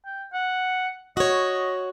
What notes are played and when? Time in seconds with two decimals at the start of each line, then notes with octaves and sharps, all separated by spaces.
0.05 G5
0.33 F#5
1.17 F#4 C#5 D#5